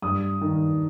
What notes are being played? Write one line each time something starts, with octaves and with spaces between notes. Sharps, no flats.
G2 D#6
D#3